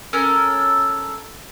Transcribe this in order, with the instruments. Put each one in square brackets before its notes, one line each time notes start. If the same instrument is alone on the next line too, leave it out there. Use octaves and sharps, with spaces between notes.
[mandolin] C#4 A4 A#4 F6